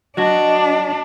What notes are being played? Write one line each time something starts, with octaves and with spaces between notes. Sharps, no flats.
F#3 D4 F#4 D#5